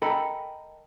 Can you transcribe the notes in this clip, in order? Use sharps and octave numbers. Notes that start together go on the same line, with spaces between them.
A4 A#4 D#5 G5 G#5 B5